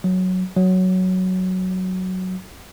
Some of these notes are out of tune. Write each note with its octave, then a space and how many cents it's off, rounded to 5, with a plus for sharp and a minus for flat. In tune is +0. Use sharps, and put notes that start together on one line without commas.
F#3 +0
F#3 +5